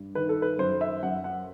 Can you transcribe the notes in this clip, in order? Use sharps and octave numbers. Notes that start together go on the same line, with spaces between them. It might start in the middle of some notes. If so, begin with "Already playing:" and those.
Already playing: G2
D#3 B4
A4
B4
F#2 C5
E5
F#2 F#5
F#5